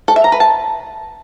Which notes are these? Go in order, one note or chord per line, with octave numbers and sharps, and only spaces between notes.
A4
E5
A#5
B4
A5